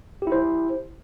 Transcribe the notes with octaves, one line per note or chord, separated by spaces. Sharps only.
E4 G4 C5